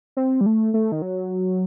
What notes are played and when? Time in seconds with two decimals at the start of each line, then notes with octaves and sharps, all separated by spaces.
0.17 C4
0.41 G3
0.46 A3
0.74 A3
0.92 D#3
1.02 F#3